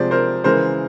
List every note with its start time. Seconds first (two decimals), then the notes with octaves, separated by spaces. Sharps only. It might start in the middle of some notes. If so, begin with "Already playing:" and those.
Already playing: C3 F3 G#3 C5 D5
0.11 A#4 C5
0.44 C#3 E3 G#3 A#4 C5